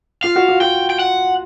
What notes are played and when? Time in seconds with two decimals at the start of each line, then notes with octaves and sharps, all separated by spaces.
0.23 F4 F5
0.36 F#4
0.49 F4
0.61 F#4 G5
0.90 G5
0.99 F#5